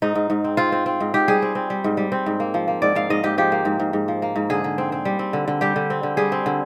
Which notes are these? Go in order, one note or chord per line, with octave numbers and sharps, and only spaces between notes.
G#2 D#4
G#2
G#2
C4
C4 F4
C4
C4
G#2
G#2 G4
G3 G#4
C4
C4
G3
G#2
G3
C4
G#2
A#3
F3
A#3
G#2 D5
G#2 F5
G#2 D#5
G#2 G4
F3 G4
A#3
G#2
G#2
G#2
F3
A#3
G#2
D3 G#4
D3
C4
C4
G3
C4
D3
D3
G3 G4
D3
C4
D3
G3 G#4
C4
D3